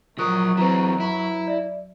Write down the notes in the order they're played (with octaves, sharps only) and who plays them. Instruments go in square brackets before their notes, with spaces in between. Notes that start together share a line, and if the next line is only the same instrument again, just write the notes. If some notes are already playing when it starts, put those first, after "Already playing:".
[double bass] F#2 F#3 [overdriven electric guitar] F3 A#4 [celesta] C#6 D#6 F#6
[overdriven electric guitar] E3 C4 [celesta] B4 A#5
[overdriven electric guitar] E4
[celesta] D5 E5